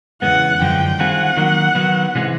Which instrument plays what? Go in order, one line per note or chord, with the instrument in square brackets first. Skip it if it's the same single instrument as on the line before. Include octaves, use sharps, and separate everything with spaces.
[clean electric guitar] E2 C#3 E3 G#3 B3 [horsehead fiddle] F#5
[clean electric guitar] F#2 D3 F3 G#3 [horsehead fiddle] G5
[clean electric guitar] D#3 G3 C4 F4 G#4 [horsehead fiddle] F#5
[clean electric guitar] D#3 F#3 A#3
D#3 F#3 B3
C3 E3 G#3